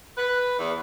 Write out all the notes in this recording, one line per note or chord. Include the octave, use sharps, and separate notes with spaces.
B4
E2